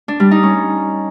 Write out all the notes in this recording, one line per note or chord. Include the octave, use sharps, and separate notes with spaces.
D4
G3
D#4
C#4